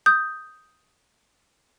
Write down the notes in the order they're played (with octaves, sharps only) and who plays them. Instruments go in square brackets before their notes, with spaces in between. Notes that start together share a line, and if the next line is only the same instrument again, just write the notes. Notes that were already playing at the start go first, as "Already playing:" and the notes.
[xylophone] D#6 G6